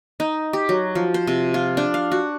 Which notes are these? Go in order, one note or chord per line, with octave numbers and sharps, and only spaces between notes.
D#4
G4
F#3
F3
C5
C3
F4
D4
F5
F#4